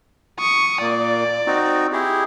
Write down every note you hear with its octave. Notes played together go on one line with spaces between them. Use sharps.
C#6 D#6
A#2 A#3 D5
C4 D#4 F#4
E4 G4 G#4